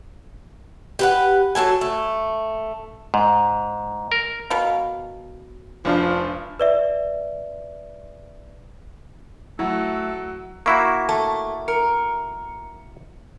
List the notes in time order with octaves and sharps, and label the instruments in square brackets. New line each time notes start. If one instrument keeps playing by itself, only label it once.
[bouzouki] G4 B4 F#5
F#3 B3 A4 G#5
A3
[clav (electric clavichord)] G#2
A#4
[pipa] B2 A#4 F5
[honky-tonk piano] F1 D4 F4 [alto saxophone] F3
[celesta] B4 D5 E5
[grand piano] F#3 F#4 [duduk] A3 [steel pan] E4 [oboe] A4
[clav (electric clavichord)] A#3 E4 F#4 [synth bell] C#6
[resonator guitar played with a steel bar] A3 [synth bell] A5
[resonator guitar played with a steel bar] A#4 [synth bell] C#7